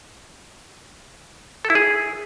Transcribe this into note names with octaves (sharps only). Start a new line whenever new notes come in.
A4
E4
G#4